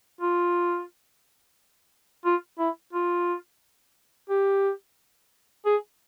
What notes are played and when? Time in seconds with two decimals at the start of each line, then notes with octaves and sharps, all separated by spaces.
0.21 F4
2.25 F4
2.59 E4
2.93 F4
4.29 G4
5.66 G#4